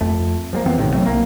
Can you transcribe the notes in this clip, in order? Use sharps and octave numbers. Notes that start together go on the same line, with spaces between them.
F2 A3
F3 G3 A#3
F2 E3 B3 C4
A#1 A2 C3 D#3
F#3 A3 C4
B1 A#3